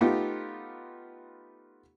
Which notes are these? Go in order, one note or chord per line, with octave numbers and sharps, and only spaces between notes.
A3 B3 D#4 F4 G4